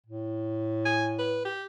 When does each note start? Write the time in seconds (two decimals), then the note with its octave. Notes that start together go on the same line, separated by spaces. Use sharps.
0.06 A2
0.85 G#5
1.19 B4
1.45 G4